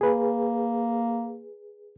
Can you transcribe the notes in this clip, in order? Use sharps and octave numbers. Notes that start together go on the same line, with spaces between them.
A#3 G#4 B4